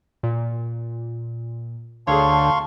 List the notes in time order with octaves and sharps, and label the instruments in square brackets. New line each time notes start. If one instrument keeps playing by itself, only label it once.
[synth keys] A#2
[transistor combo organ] D2 [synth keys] G#4 A4 C#5 [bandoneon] F5 C6 C#6 [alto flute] A5